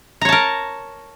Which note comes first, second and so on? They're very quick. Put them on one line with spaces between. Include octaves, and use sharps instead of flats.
A#5 C#5 A5 A#4